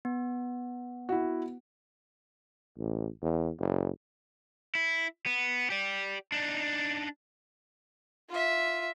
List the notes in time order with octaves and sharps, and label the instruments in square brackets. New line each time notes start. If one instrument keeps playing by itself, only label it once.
[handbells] B3
[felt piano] E4 F#4
[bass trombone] A1
E2
F#1
[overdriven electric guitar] E4
B3
G4 D5
D4 D#4
[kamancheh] F4 E5